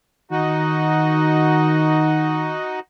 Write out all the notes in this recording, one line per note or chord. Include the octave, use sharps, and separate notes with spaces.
D#3 D#4 F#4